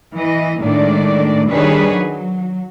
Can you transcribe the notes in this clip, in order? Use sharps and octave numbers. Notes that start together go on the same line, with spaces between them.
E3 D#5
A2 D#3 G#3 A3 D4 D5
D#3 G3 D4 G#4 B4 C#5
F#3